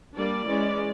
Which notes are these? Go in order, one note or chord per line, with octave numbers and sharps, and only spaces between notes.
G3 A#3 D4 D5
E3 G#3 C#4